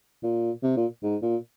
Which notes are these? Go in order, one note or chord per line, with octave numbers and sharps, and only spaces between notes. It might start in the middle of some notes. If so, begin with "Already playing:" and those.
A#2
C3
A#2
G#2
A#2